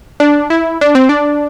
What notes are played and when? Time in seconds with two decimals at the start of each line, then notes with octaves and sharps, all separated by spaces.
0.20 D4
0.50 E4
0.81 D4
0.95 C4
1.09 D4